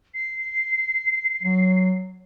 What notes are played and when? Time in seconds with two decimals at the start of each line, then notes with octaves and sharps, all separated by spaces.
0.14 C7
1.43 F#3